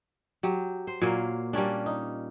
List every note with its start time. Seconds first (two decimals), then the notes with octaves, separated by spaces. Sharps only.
0.43 F#3 G4
0.87 C5
1.01 A#2 F#3 A#3
1.53 G3 A#3 C#4 D4
1.86 D#4